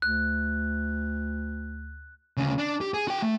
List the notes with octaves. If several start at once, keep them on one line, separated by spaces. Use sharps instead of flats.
D2 F#6
D2 C#3
D4
G4
G#4
F#4 G5
A3